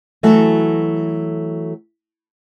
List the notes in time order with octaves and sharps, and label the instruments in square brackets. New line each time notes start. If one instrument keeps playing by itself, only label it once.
[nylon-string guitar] E3 F#3 A3 F#4 A4